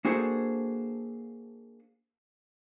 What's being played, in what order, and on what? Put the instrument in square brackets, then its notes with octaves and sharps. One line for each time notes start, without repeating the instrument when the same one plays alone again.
[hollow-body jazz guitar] A#3 D4 F#4 G#4 A4 C5